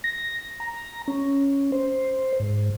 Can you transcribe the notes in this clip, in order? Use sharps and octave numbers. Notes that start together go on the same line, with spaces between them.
A#6
A#5
C#4
C5
G#2